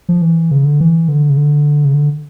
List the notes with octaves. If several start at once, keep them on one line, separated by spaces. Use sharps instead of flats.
F3
E3
C#3
D3
E3
D3
C#3
D3
C#3
D3